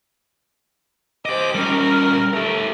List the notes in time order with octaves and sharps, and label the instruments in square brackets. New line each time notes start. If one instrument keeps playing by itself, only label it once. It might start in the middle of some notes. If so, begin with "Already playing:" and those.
[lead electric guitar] G4 D#5 [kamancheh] C5 D6
[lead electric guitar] G3 C#4 [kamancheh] A#4
[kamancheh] A3 [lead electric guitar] G4 A#4